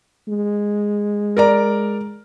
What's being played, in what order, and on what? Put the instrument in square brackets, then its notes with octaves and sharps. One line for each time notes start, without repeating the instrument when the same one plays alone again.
[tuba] G#3
[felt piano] A#4 D5 A#5